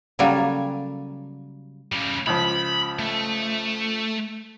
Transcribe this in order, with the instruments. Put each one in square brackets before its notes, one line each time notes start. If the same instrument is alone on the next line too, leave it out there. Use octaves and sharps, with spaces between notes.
[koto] C#3 F#3 G3 A#3 A4 G#5
[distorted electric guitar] C#3 G3
[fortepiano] C#2 F3 [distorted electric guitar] B5
[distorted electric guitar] A3